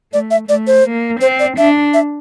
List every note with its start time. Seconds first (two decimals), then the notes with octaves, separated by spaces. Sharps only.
0.13 A3 D5
0.31 E5
0.49 A3 D5
0.67 C5
0.85 A#3
1.21 C4 C5
1.39 D5
1.57 D4 E5
1.94 E5